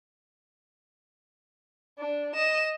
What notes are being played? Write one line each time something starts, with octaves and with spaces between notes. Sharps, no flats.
D4
D#5 E7